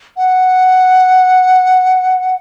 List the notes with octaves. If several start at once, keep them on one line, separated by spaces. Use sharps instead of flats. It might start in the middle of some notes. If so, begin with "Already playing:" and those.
F#5